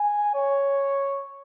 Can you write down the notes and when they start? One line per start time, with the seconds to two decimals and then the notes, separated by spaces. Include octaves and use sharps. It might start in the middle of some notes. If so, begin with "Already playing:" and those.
Already playing: G#5
0.35 C#5